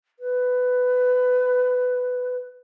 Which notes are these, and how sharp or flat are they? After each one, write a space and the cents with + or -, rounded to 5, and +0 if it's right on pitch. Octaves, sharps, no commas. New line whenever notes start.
B4 +15